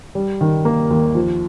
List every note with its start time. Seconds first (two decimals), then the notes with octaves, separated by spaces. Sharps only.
0.15 G3
0.41 D#3
0.65 A#3
0.90 D#2
1.15 F3